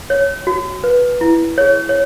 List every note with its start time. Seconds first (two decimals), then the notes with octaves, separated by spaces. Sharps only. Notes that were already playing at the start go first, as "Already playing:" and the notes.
0.10 C#5
0.47 F#4
0.84 B4
1.21 E4
1.58 G#4 C#5
1.89 C#5